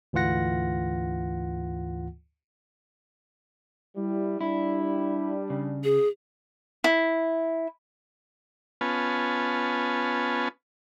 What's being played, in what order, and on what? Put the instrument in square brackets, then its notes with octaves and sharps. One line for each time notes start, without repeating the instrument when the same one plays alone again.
[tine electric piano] D2 G#2 E3 F4 F#5 A#6
[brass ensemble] G3 E4
[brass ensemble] G3 D4 [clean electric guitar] E4
[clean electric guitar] C#3
[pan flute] G#4
[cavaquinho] E4
[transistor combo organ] B3 C#4 F4 B4 G#5 A5